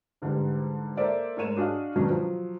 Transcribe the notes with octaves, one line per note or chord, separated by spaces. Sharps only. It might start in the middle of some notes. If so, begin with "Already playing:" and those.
G#2 D3 E3 G3
A#3 A4 C5 D5 E5
G#2 A3 A#4 C#5 D#7 E7
D4 F#4 G#4 D#5 F5
B2 D#3 F#3 B3 C#4 D4
F3 F#3